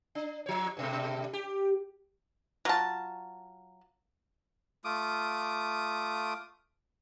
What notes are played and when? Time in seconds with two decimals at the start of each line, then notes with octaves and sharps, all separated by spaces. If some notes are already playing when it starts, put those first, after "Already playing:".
0.15 D4
0.46 F3 C#5
0.77 G2 B2 A3
1.33 G4
2.65 F#3 F4 A5
4.85 A3 F4 D6 D#6